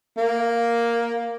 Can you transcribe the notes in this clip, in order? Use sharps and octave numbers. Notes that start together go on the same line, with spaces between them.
A#3